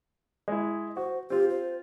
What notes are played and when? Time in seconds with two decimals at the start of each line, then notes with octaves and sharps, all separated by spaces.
0.48 G#3 E4
0.97 F#4 C5
1.30 C4 F4 G4
1.50 C5